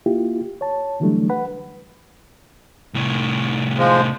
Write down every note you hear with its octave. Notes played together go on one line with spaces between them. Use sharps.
A#3 E4 F4 G4
C#5 A5
D3 E3 F#3 G3 A3 D4
B4 F#5 B5
C2 A2
F3 G#3